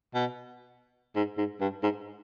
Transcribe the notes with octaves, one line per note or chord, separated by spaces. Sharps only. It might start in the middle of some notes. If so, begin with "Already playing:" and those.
B2
G#2
G#2
G2
G#2